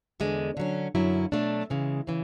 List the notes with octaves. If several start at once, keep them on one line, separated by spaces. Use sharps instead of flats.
E2 D3 G#3
D3 F#3 C#4
F#2 D3 F#3 C#4 E4
B2 F#3 A3 D4
C#3 E3 G#3
C#3 E3